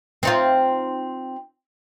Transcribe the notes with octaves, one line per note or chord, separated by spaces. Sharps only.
C4 D#4 F4